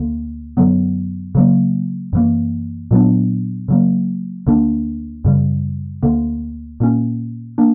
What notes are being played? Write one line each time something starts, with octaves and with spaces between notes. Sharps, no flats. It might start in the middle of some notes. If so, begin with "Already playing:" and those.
Already playing: D2 D3 A#3
F#2 D3 F#3 B3
C#3 F#3 A#3
F#2 E3 A#3
A#2 F#3 B3 D4
C#3 F#3 A#3
D2 D3 A#3 D4
F#2 C#3 G3
D2 D3 A#3
A#2 A#3 C#4
A#3 D4